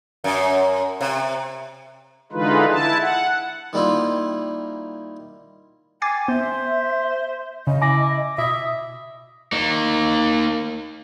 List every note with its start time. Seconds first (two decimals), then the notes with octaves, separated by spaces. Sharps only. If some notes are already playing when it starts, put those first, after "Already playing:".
0.24 F#2
1.01 C3
2.32 D3 E3 G#3 D#4 F4 B4
2.70 E4 A5
3.01 F#5
3.73 D#3 G3 A#3 E4 F4
6.02 G5 G#5 D6 A6 C7
6.28 B3 C5 E5
7.67 C#3 D#5
7.82 E4 G#5 D6 A#6
8.38 B2 E5 D#6
9.52 A#3 D#4